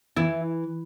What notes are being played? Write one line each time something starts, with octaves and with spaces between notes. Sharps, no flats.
E3 E4